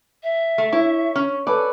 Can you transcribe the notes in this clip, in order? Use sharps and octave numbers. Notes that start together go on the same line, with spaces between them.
E5
A3
E4 C#5
C#4
A4 B4 D5 G#5